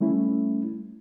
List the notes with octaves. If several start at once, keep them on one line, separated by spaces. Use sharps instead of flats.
G3 A3 C#4 E4